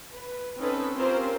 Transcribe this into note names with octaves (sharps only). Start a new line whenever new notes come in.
B4
C4 C#4 D#4 A4 B4
C4 C#4 F4 G4 A#4 C5